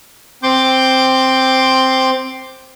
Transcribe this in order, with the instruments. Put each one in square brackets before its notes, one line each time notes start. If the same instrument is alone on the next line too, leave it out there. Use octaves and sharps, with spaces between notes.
[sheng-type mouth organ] C4 C6 D6 G6